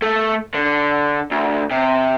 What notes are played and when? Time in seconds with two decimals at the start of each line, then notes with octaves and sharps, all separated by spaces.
0.02 A3
0.54 D3
1.31 D2
1.71 C3